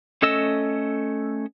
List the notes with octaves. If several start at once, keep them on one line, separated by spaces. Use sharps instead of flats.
A3 C#4 A4 D#5 E6